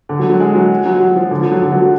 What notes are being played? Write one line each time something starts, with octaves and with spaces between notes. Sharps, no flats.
D3
F#3
F#3
G#3
F#3
F#3
F#3
F3
D3
F3
F#3
D3
F#3
F#3